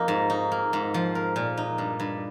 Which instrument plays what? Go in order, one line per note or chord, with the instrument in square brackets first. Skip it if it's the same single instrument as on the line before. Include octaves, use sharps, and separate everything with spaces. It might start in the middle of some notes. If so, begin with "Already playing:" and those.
Already playing: [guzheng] F2 A#3 D#4
G#2
D#4
A#3
G#2
F3
A#4
A#2
D#4
G2
G2